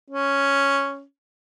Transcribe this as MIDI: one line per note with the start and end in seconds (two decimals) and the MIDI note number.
0.10 1.02 61